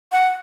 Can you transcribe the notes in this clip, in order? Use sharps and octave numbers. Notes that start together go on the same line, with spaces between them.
F#5